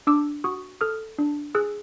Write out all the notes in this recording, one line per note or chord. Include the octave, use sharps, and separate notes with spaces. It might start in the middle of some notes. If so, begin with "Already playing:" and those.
D4 D6 E6
F#4 C#6 D#6
A4 D#6 F6
D4
G#4 E6 F#6